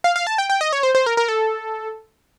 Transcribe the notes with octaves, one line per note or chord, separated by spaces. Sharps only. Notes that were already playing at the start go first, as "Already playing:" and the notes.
F5
F5
A5
G5
G5
D#5
C#5
C5
C5
A#4
A#4
A4